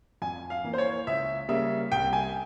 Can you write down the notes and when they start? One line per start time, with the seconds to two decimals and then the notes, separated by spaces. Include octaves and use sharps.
0.22 F2 G#5
0.50 F5
0.64 E3 A#3
0.73 C5
0.78 C#5
1.07 C#2 E5
1.49 C#3 G3 A#3 E5
1.92 C2 G5
2.13 G#5